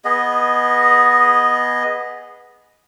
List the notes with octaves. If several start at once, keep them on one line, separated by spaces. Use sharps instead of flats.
B3 G#4 D#5